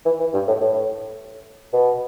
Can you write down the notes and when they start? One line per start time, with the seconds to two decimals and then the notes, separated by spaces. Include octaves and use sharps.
0.05 E3
0.19 E3
0.34 G2
0.48 A2
0.61 A2
1.73 B2